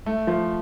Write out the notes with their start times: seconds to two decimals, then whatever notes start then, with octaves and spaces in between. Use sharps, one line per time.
0.06 A3
0.27 F3